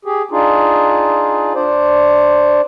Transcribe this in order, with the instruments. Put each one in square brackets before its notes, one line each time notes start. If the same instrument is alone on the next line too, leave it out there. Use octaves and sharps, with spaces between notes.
[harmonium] G4 G#4
D4 D#4 F4 G#4
D4 C5 D5